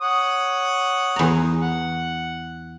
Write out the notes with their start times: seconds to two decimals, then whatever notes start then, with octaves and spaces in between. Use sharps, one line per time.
0.01 C#5 F#5 D#6
1.16 E2 A#5
1.62 F#5